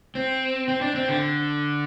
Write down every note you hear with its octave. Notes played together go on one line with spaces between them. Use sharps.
C4
C4
D4
C4
D3